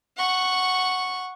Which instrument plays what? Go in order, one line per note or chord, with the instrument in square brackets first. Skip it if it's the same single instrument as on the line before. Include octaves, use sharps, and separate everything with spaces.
[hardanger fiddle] F#5 C#6